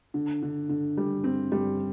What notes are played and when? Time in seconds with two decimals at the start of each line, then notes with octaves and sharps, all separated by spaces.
0.14 D3
0.42 D3
0.69 D3
0.97 G3
1.24 C4
1.52 G3